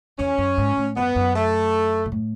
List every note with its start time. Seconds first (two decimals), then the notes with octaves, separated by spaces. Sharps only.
0.19 E2 C#4
0.38 F#2
0.58 G#2
0.77 A2
0.97 F#2 B3
1.16 F#2
1.35 A3
2.06 B2
2.12 A2